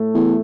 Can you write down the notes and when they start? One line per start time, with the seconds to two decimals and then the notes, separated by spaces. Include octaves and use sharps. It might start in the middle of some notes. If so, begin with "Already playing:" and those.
Already playing: A2 A3
0.14 E2